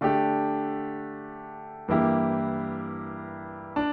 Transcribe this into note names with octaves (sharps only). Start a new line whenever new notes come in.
D3 A3 D4 G4
G2 E3 A#3 E4 G4
D4